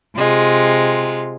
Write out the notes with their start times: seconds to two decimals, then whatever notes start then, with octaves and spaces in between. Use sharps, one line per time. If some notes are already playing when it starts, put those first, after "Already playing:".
0.17 C3 G#3 F4